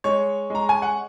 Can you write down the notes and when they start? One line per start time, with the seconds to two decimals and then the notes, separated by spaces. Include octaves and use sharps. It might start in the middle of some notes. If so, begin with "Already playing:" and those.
0.04 G#3 C#5
0.50 G#3 A#5
0.69 G#5
0.82 F#5